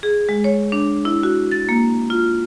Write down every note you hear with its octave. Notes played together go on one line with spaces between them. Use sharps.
G#4
G#3
C#5
D4
E4
F#4
A6
A#3
F4